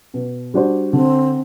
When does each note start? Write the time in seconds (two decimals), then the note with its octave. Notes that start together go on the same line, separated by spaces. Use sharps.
0.14 B2
0.54 G3 D4 F#4 C5
0.93 D3 C4